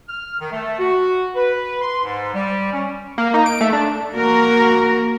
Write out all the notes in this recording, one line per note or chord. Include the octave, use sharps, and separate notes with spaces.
F6
D#3
A3
F#4
B4
C6
G#2
G3
C#4
A#3
D#4
D7
A3
D4
A#3 F#4 A#4